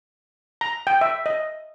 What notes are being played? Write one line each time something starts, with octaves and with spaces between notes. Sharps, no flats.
A#5
G5
E5
D#5